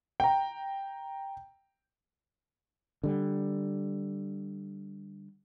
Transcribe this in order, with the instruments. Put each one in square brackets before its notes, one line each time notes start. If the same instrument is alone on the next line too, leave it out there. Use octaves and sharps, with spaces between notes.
[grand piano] G5 A#5
[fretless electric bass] D3 G3